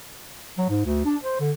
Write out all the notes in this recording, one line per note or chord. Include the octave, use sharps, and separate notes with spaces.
F#3
G#2
D2
D4
C5
D3